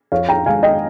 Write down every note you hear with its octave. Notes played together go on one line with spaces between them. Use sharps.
F2 C#5 F5
G5 A#5
D#3 G#3 F5 G#5
D#5 G5